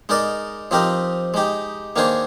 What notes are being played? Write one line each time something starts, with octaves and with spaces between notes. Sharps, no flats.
G#3 D#4 A#4 D5
F3 C4 D#4 G4 A#4
G#3 D#4 G4
D#3 A#3 D4 G#4 C5